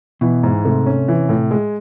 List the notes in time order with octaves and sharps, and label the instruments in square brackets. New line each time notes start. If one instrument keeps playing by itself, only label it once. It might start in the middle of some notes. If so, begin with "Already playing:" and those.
[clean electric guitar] B2 [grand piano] E3
[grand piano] G#2
[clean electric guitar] C3 [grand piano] A3
[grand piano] C#4
E3
A2
G#3